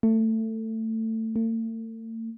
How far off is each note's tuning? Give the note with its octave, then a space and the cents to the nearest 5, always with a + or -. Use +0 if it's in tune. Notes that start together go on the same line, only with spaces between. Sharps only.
A3 +20
A3 +45